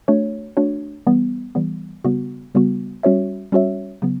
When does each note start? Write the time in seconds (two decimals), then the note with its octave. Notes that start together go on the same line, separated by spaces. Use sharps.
0.08 A3 D4 F#4 C#5
0.57 A3 D4 F#4 C#5
1.07 E3 G3 B3
1.55 E3 G3 B3
2.04 C#3 G3 B3 F#4
2.55 C#3 G3 B3 F#4
3.03 G3 C#4 F#4 C#5 E5
3.52 G3 C#4 F#4 C#5 E5
4.02 C#3 F#3 B3